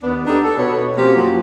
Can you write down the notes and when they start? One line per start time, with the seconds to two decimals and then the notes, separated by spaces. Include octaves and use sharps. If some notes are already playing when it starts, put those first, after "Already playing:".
0.02 D#2 B3 D4
0.27 B3 D4 D#4 G4 A4
0.44 A4
0.58 B2 B3 C#5
0.97 F3 A#3 C4 C#4 F#4 G4
1.17 F#2 F3 F#3 F#4